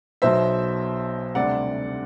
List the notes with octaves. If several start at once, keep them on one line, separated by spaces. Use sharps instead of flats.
B1 B2 F#3 C5 E5
D2 C3 G3 D5 F#5